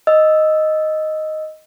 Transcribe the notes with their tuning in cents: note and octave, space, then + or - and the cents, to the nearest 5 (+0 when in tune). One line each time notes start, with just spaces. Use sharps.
D#5 +0 E6 +0